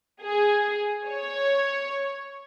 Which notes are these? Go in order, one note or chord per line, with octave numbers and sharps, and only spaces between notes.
G#4
C#5